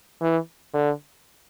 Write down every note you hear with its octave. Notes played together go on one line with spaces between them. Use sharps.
E3
D3